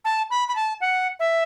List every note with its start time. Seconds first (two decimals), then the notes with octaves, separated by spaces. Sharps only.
0.05 A5
0.30 B5
0.48 B5
0.56 A5
0.81 F#5
1.20 E5